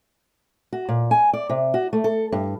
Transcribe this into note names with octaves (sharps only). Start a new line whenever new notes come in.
F#4
A#2
G#5
D5
C3
F#4
A3
A4
G2